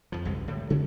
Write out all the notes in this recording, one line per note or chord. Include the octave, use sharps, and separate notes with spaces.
F2 F3
B1 G2 C#3 G#3
A2 D3 G3
C#3 F#3 G#3 C#4